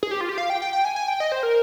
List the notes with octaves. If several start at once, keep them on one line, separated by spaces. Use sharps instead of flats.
G#4
G4
F4
G4
F5
G5
G5
G5
G#5
G#5
G5
D#5
C5
A#4